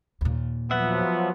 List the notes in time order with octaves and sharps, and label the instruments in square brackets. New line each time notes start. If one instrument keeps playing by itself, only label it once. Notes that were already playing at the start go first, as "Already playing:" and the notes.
[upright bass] D#2 A#2
[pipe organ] F3 F#3 [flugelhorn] B3 [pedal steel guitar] E5 F#5